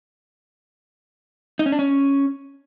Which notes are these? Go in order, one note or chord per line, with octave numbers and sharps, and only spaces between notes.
D#4
C#4
D4
C#4